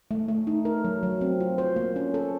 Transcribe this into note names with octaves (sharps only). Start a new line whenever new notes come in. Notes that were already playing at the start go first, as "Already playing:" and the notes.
A3
A3
D#4
A#4
F#3
F#3
C4
F4
C5
A#3
C#4
A4